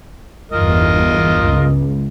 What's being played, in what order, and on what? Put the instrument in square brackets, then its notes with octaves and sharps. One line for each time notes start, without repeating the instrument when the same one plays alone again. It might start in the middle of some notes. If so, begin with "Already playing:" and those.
[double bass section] G1 E2 [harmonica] F4 A#4 D#5
[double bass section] C#2